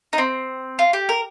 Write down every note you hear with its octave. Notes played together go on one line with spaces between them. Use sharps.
D#4
C4
F4
G4
A#4